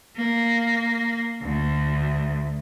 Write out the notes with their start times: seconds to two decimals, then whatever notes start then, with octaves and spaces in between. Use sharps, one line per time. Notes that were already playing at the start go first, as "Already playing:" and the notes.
0.17 A#3
1.42 D2